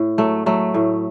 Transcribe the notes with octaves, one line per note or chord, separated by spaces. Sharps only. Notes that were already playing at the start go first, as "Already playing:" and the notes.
Already playing: A2
F#3 A3
F#3 A3
A2